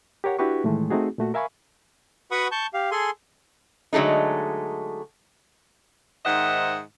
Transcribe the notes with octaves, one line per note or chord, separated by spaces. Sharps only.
G4 A#4 C#5 F#5
D4 E4 F#4 G4 B4 C#6
A2 D#3 E3 G#3 A3
A3 C4 D#4 F#4 G#4
A#2 A3 F#4
A#4 E5 F5 G#5 B5 C#6
F#4 B4 F#5 B5 C#6 D#6
A5 C#6 G6
G4 F5
G#4 A4 G#5 C6
D3 F#3 G#3 A3 D#4
G#2 D#3 C5 D#5 E5 F#5